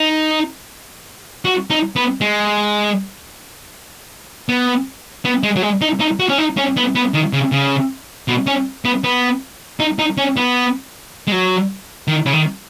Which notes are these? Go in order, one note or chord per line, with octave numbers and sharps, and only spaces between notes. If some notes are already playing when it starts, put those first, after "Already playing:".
Already playing: D#4
F#4
D#4
B3
G#3
B3
B3
G#3
F#3
G#3
D#4
D#4
F#4
C#4
D#4
C#4
B3
B3
D#3
C#3
C#3
B2
C#4
B3
B3
D#4
D#4
C#4
B3
G#3
F#3
D#3
C#3
D#3